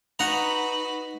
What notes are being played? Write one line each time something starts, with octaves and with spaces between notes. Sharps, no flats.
D#4 F#4 B4 F#5 A#5